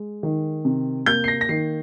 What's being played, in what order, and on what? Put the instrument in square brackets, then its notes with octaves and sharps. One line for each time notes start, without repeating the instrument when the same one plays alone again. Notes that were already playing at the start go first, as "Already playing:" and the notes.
Already playing: [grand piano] G#3
D#3
C3
A#3 G6
C7
A#6
A#6
D#3 C7